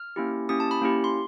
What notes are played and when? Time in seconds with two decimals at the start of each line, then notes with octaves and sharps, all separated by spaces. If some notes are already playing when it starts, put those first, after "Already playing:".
Already playing: F6
0.16 A#3 C#4 E4 G4
0.49 A#3 C#4 E4 G4 D#6
0.60 A5
0.71 B5
0.82 A#3 C#4 E4 G4
1.04 C6